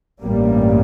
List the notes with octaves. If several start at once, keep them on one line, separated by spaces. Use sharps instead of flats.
A1 G2 G3 A#3